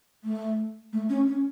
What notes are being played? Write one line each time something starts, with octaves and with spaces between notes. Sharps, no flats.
A3
A3
C#4
C#4